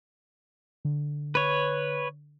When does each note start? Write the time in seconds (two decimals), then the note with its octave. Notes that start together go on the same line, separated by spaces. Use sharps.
0.85 D3
1.35 B4 C#5